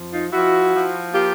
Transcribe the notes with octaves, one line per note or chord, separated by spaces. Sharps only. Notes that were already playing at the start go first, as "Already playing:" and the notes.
Already playing: F2 F3
D#4 F4
F3 E4 F#4
F3
A#3 F4 G4